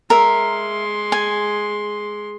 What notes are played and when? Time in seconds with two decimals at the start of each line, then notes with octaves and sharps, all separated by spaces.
0.10 G#3 A#4 E5 C6
1.12 G#5